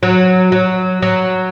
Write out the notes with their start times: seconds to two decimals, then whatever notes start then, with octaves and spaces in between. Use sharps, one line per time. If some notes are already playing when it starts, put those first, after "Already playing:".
0.03 F#3
0.52 F#3
1.02 F#3